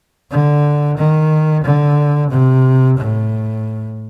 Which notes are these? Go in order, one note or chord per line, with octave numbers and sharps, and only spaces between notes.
D3
D#3
D3
C3
A2